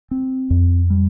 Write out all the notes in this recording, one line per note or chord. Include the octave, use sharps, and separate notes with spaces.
C4
F2
G3